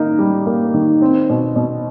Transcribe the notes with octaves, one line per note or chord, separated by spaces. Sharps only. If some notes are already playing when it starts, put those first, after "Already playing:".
Already playing: D#3 A#3 D#4
G3
A#3
D#3
C4
B2
B2